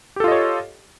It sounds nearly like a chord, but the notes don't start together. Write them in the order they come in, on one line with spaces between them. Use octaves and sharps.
G4 A4 F4 D#5 C#5